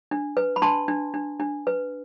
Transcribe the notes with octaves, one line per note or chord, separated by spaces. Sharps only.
D4
B4
B5
D4 A5 C6
D4
D4
D4
B4